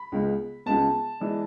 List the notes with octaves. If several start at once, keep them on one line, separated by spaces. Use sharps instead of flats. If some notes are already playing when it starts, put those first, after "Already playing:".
Already playing: B5
C#2 C#3 G#3 B3
C#2 C#3 G#3 B3 A5
E3 G#3 D4